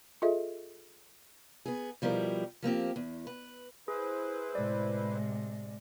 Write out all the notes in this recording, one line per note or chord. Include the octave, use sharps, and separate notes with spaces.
F4 G#4 A4 D#5 E5
B3 G#4
B2 F3 G3 E4 A#4
F3 A#3 C4 G4
E2
B4
E4 G#4 B4 C5
A2 C3 G#3 D5